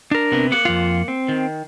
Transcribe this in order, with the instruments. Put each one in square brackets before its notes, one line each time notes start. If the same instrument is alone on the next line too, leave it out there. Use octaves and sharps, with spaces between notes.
[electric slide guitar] D4 A#4
[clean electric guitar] C3 B3
A#3 F#5
[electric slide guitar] F2 F4
C4
[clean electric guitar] D#3